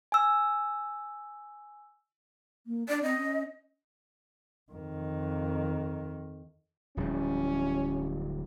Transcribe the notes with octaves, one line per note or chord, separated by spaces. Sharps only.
G#5 E6
A#3
D4 D5
C4 D#5
C#4
F2 D#3
D1 F3 G3 C#4